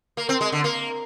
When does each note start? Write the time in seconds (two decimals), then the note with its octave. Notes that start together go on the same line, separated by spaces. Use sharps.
0.17 A#3
0.29 C4
0.41 G#3
0.52 D3
0.64 A#3